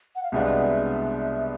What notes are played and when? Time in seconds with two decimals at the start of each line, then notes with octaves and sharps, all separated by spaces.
0.16 F#5
0.23 F5
0.32 C2 B2 G#3 B3 D4 E5